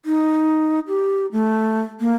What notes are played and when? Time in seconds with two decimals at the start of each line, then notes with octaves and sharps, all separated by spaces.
0.05 D#4
0.88 G4
1.32 A3
2.00 A#3